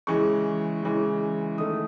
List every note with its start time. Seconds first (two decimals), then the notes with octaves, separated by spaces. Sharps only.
0.07 C#3 E3 G#3 C#6
0.82 C#3 E3 G#3
1.58 D#3 A3 D#6